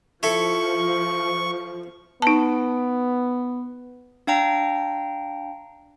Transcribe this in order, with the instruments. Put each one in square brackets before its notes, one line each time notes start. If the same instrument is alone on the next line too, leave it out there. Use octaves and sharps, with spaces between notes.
[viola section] F3 [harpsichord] E4 A4 [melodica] C#6
[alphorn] B3 [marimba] D#4 A5
[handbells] D4 F5 G5 A#5